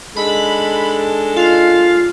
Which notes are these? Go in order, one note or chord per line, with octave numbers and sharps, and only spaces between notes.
G#3 D4 D#4 A4 B5
F4 F5